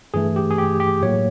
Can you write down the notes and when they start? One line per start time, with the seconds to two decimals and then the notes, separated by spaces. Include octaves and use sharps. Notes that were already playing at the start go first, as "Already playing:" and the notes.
0.14 G2 E3 A3 G#4
0.36 G4
0.51 G#4
0.58 G4
0.80 G4
1.02 A2 F#3 A#3 C#5